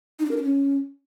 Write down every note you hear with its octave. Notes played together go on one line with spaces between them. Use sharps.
D#4
D4
A#4
D4
C#4